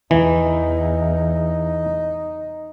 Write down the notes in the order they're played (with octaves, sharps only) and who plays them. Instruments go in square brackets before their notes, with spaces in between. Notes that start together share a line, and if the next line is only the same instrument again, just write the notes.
[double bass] E2 [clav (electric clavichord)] E3 [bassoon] D#4